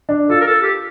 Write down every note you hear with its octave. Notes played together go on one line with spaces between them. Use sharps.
D4
F4 A4
A#4
A4
G4